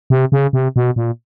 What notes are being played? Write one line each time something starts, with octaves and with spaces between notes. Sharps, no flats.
C3
C#3
C3
B2
A#2